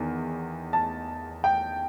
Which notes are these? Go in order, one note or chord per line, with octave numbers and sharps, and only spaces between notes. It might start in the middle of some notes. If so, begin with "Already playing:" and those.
Already playing: E2 D#3
A5
G5